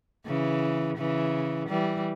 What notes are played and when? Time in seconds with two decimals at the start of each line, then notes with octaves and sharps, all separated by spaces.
0.26 C#3 E3
0.98 C#3 E3
1.69 E3 G3